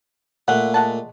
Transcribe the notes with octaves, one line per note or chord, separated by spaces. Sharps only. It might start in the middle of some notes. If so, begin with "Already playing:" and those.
A#2 A3 F#5
G#3 F#5 A5